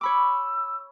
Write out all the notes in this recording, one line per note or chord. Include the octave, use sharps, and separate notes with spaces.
C#5 B5 D6 E6